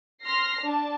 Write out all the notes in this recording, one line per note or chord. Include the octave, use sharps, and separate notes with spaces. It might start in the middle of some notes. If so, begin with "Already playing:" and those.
C6 F6 A#6 C7
D4 A5